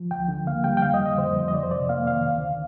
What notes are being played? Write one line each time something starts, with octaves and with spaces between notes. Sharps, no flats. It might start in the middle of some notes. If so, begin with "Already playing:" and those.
Already playing: F3
D2 G5
D3
A#3 F5
G3 G5
G5
F2 F5
D#5
D3
D#5
F2 C5
F3
D#5
F2 D5
C5
C3 D5
A#3 F5
D#3 F5
D2
D3